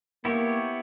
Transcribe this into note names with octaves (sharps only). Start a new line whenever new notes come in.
A#3 B3 E4 G4 C#5